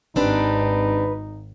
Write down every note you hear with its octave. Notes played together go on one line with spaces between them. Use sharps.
G#1 C4 D4 D#4 G4 B4